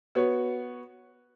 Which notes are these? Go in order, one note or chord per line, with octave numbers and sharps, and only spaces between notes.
B3 F#4 C#5